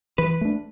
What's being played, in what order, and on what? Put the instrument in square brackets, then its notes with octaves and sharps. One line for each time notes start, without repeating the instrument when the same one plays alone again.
[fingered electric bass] E3 [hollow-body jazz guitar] B4
[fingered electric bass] A3 D4